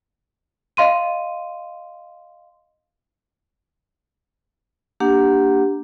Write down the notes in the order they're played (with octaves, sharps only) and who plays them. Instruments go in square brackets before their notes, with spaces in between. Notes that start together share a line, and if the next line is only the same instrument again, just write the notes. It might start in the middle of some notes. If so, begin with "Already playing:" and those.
[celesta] D#5 F5 C6 D#7
[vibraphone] A#3 D4 G4 F#5